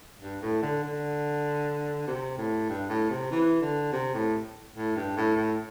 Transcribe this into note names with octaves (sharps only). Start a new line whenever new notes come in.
G2
A2
D3
D3
C3
A2
G2
A2
C3
E3
D3
C3
A2
A2
G2
A2
A2